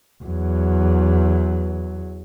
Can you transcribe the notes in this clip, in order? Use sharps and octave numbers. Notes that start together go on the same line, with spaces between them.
E2 F#3